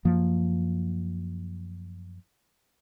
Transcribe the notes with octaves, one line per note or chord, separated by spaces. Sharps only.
F#2 F3 A#3